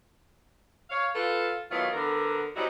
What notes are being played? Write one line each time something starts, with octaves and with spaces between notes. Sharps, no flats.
C#5 F5
F4 A4 B4
D#3 E3 F#3 A3 B3 F4
D3 B3 A#4
G3 C4 C#4 D#4 E4 F#4